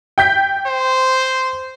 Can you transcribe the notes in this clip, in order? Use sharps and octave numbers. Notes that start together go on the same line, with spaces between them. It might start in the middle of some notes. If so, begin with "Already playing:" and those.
G5 G6 B6
C5